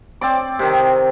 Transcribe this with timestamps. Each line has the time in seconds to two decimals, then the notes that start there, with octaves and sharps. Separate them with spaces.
0.21 C4 D5 D6
0.59 C3 D#3